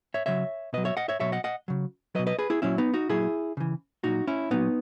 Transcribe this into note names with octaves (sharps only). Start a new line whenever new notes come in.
C#5 E5
C#3 F#3 C#5 E5
B2 F#3 B4 D#5
C#5 E5
D#5 F#5
C#5 E5
B2 F#3 C#5 E5
D#5 F#5
D#5 F#5
C#3 F#3
B2 F#3 B4 D#5
B4 D#5
G#4 B4
E4 G#4
A#2 F#3 C#4 E4
B3 D#4
D#4 F#4
A#2 F#3 E4 G#4
C#3 E3
A#2 F#3 D#4 F#4
C#4 E4
A#2 F#3 B3 D#4